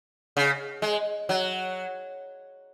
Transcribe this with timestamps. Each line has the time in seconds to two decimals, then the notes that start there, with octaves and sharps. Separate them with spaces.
0.37 C#3
0.82 G#3
1.29 F#3